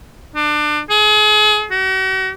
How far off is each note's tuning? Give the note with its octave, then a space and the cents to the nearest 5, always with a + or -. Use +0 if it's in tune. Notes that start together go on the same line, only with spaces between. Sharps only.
D4 +30
G#4 +35
F#4 +45